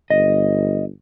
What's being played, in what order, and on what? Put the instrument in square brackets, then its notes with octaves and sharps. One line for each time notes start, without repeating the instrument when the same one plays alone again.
[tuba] G1 [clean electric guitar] D#5